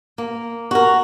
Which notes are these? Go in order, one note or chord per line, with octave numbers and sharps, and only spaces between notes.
A#3
F#4 A#4